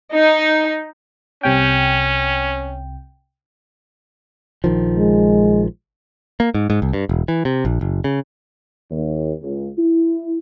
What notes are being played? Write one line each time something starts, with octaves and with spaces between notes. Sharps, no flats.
D#4
C2 C3 C#4 G5
A#1 D#3 F3
G#3
A#3
G#2
G#2
C2
G2
E1
E3
C3
A#1
F#1
C#3
D#2
C#2
E4